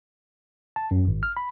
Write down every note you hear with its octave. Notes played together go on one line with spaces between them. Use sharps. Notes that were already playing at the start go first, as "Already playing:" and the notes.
A5
F#2
G#1
F6
B5